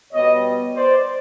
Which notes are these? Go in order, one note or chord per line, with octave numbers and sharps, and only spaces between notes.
B2 G3 B3 C#5 D#5
C5 D5